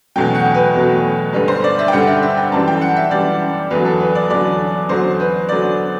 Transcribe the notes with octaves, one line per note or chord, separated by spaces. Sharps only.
E2 B2 F#3 A3 G5
F#5
B4
E2 B2 F#3 A3
G2 D3 G3 B4
C5
D5
E5
G5
G2 D3 G3 F#5
E5
E5
G5
F#2 E3 G3 A5
G5
F#5
E5
F#2 E3 G3 D5
E2 D3 F#3 B4
A4
B4
D5
E2 D3 F#3 D5
E2 D3 F#3 C5
B4
D3 F#3 D5